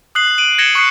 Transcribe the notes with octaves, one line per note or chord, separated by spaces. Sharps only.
D#6 F#6 C7 F#7
D7 D#7 F#7
G#6 A#6 C#7 E7 G7
C#6 D#6 F#6 C7 C#7